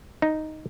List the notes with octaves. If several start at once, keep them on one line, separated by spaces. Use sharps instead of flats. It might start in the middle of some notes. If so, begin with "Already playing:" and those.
D#4